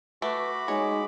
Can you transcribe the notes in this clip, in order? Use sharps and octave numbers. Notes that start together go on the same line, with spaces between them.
A3 F#4 B4 B5 D6
G#3 D#4 C#5